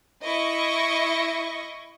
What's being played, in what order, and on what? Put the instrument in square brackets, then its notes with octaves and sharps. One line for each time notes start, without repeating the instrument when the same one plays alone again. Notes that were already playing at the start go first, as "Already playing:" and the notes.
[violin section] E4 D#5 C#6